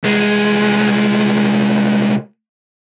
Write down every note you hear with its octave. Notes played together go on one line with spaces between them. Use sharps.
C2 G#3